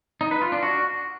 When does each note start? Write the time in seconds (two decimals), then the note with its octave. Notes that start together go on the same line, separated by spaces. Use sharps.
0.21 D#4
0.31 B4
0.42 F4
0.52 D4
0.63 F#4